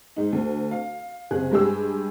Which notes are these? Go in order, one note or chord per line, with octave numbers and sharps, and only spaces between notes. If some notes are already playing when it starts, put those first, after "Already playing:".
G#2 D#4
D2
F5
F#1 C3 G#4 F#6
G2 G#3 G4 G#4 E6